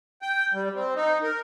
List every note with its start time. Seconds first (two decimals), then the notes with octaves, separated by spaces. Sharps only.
0.22 G5
0.53 G3
0.75 C4
0.96 D#4
1.23 A#4